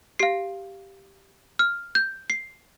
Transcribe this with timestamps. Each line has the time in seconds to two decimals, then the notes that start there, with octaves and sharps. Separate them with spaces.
0.19 G4 F5 C7
1.59 F6
1.95 G6
2.30 C7